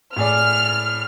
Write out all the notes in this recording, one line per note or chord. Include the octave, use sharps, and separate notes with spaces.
A2 G#4 D5 F6